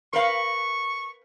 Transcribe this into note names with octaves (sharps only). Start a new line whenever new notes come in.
A#4 B4 F5 C#6